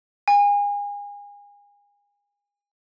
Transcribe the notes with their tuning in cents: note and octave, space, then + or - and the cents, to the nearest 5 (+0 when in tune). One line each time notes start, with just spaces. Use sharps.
G#5 -35